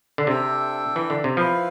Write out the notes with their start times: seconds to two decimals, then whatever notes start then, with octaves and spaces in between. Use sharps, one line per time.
0.18 D3
0.27 C3 D4 A4 E5 G5
0.96 E3
1.10 D3
1.24 C3
1.37 F3 E4 B4 F5